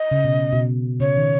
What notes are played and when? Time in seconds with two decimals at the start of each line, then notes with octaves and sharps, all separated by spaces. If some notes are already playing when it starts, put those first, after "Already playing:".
Already playing: D#5
0.11 C#3
0.25 B2
0.52 B2
1.00 C#3 C#5
1.17 D#3